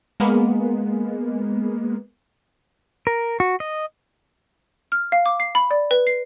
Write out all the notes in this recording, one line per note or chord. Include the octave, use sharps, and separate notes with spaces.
G#3 A#3 B3
A#4
F#4
D#5
F6
F5
D6
C7
B5
D5
B4
C7